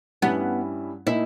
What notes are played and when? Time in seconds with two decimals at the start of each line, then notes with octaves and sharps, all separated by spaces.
0.22 G2 G3 B3 C#4 E4
1.07 A#2 A#3 D#4 E4